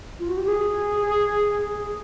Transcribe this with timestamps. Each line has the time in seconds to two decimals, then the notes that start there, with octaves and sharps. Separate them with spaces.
0.19 F4
0.28 F#4
0.37 G4
0.46 G#4